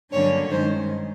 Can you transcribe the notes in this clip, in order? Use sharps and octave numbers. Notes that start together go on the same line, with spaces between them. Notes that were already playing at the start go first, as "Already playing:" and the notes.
G2 D3 F#3 A#3 C#4 C#5
G2 D#3 G#3 C5